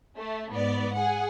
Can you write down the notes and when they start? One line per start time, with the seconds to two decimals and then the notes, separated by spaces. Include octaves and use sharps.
0.18 A3
0.51 G#2 B3 D5
0.95 G#4 F#5